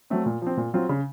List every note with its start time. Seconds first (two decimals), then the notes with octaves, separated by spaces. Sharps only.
0.10 F#3 A3 C4
0.26 A#2
0.42 F3 C4
0.57 A#2
0.74 F#3 C4 F4
0.89 C#3